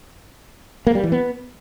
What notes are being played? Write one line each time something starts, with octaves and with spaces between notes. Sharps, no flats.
A#3
G3
E3
B3